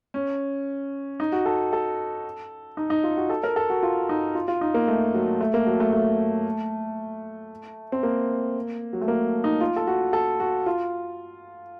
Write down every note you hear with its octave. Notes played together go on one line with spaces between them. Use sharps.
C#4
D#4
F#4
A4
A4
D#4
D#4
F4
F#4
A4
A#4
A4
F#4
F4
D#4
F4
F4
D#4
A#3
A3
F#3
A3
A#3
F#3
A3
A3
C4
A#3
F#3
A3
A#3
D#4
F4
A4
F#4
A4
F#4
F4